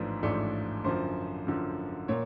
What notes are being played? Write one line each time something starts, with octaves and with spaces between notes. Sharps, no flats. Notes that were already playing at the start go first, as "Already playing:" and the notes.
Already playing: A1 G#2 F3 A3 D4 B4
A1 G#2 F3 A3 D4
F#2 D3 F3 C5
F#2 D3 F3
A#2 C#5